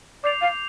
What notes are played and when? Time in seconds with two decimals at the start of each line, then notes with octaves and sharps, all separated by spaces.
0.23 D5 D6 G6 C7 F7
0.41 F5